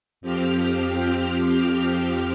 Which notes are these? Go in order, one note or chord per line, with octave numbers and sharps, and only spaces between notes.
F2 F3 C4 G4 F6